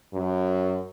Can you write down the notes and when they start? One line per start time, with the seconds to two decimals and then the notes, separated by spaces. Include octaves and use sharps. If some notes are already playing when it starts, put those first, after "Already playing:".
0.13 F#2